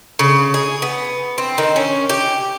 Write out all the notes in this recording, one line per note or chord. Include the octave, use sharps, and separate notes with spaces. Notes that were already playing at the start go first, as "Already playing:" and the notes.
C#3
G#4
B3
C4
D#3
C#4
G4